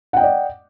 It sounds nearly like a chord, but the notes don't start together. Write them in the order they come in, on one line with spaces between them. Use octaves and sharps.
F#5 G5 D#5 D5